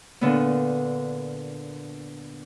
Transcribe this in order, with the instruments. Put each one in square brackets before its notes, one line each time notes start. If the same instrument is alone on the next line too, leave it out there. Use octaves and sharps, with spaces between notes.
[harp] A#2 D3 B3